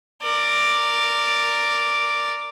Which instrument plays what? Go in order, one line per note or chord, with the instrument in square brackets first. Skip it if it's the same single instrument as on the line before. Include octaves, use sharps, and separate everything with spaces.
[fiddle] A#4 D5